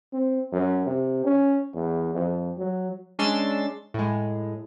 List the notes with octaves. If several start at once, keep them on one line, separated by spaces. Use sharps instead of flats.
C4
F#2
C3
C#4
E2
F2
F#3
G#3 C#4 D4 C6 E6 A6
A2 G#3